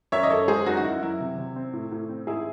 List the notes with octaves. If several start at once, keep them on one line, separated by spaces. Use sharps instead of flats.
F#2 C#5 E5
D#5
F#2 A4 C#5
G#3 G#4 C5
F#2 D#4 F#4
F#4
F#2 E4
F#3 E4
C3
C3
C4
A2
A2
C4
G#2 E4 G#4